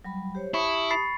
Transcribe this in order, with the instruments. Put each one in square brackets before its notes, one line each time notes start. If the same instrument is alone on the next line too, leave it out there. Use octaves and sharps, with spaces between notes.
[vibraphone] F#3 G3 B5
G4 C5 C#5
[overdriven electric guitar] E4 [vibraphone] G4 A5 D#6 [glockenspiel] B5 C#6 C#7
[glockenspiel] B5 A6 C7